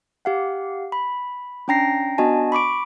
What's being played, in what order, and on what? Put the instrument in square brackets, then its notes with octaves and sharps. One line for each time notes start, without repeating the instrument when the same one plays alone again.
[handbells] G4 F5 F#5
B5
C#4 D4 G5 A#5 A#6 C7
B3 D4 F#4 D#5 G#5 A5
B5 C#6 D6 D7